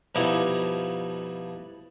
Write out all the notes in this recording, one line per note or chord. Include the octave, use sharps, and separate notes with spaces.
F2 B2 F3 G3 D#4 E4